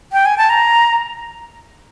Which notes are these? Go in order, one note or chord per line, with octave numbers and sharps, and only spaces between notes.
G5
G#5
A5
A#5